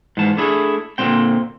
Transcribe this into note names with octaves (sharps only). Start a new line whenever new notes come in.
G#2 E3 A5
A3 D4 E4 G#4 A4
A#2 D3 F#3 C4 G5